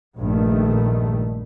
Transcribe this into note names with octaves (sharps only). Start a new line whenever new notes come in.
A#1 G2 D#3 A3